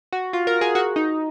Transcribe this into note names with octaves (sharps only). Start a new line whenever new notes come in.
F#4
F4
A#4
G#4
F#4
D#4